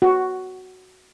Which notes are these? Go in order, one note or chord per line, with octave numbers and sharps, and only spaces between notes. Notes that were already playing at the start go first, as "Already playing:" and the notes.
F#4